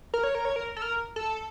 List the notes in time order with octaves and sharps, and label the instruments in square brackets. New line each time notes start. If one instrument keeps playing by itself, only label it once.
[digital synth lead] A#4
C#5
A#4
C#5
A#4
A4
A#4
A4